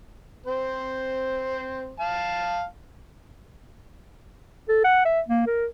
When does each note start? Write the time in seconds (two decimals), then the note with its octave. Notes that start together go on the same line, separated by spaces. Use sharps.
0.46 C4 C5
2.00 F5 A5
4.69 A4
4.84 F#5
5.05 E5
5.28 A#3
5.47 A#4